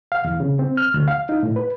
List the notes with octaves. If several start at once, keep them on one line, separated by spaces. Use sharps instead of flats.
F5
E2
C#3
C4
F6
D2
F5
D#4
A2
B4